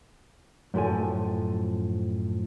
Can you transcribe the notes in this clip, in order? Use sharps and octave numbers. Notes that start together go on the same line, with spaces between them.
F#2 A2 F3 A4 G#5